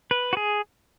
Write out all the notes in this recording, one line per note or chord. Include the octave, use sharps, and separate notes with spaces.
B4
F#4
G#4